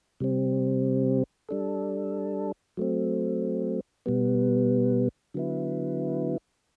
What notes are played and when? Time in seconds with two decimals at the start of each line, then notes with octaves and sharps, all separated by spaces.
0.20 C3 G3 C4
1.49 G3 D4 A4
2.77 F#3 A3 C4
4.06 B2 G3 B3
5.34 D3 F#3 B3 E4